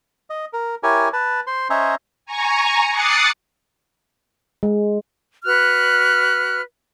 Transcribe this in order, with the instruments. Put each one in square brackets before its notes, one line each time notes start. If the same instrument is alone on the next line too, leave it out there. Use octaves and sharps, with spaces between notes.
[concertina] D#5
A#4
E4 G4 A#4 C#5 G#5
B4 A5
C5 C6
C#4 C5 C#5 D#5 E5 A#5
[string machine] G#5 A#5 C#6
D6 D#6 F#6 A6 C7 C#7
[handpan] G#3
[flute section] F#4 B4 F6 F#6